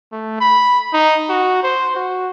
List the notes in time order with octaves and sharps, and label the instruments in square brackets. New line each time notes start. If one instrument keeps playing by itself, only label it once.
[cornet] A3
B5
D#4
F#4
C5
F#4